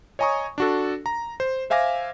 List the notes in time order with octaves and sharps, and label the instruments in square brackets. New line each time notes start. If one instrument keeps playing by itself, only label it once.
[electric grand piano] C#5 D#5 G#5 A#5 C#6 D#6
D4 F#4 A4
A#5
C5
C5 E5 F5 G#5 D6 A#6